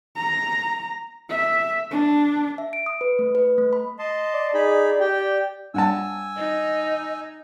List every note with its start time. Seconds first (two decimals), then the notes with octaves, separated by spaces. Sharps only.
0.17 A#5
1.29 E5
1.91 D4
2.58 E5
2.73 D7
2.86 D#6
3.01 B4
3.19 A3
3.35 B4
3.58 A3
3.73 B5
3.99 D#5 A5 C6
4.34 D5
4.54 D#4 G#4 B5
5.00 G4 G5
5.74 G2 F#5 G#5 A5 E6
6.36 D#4 D#5